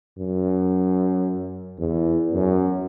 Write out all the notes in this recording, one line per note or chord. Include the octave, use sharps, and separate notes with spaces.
F#2
E2
F#2